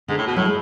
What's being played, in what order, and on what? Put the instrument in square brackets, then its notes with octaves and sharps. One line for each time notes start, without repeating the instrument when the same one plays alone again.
[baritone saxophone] G#2 [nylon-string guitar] D3
[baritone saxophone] A2
B2
[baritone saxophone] A2 [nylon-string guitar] F#3
[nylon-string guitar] G#3